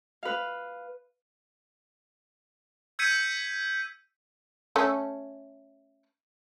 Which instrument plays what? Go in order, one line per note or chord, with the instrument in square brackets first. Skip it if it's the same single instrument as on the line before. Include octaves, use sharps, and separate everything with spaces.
[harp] B4 F5
[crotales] E6 G6 G#6 B6 C#7 D#7
[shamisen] A3 C#4 A4